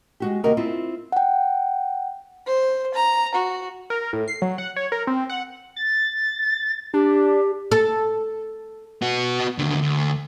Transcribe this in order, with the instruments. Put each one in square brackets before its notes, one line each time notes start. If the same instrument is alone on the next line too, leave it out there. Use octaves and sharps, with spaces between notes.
[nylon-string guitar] G#3 F#4 G4
D#2 C3 F#4 A#4 D#5
C4 E4 F4
[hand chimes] F#5 G5
[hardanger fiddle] C5
A#5
F#4
[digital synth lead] A#4
A2
C7
F#3
F#5
C#5
A#4
C4
F#5
[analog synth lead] A6
[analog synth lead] D4 [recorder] G4
[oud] A4
[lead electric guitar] B3 F#4
D#2 D3
D2